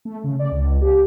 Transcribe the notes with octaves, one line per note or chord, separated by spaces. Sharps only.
A3
C#3
D5
C#2
C#2
G4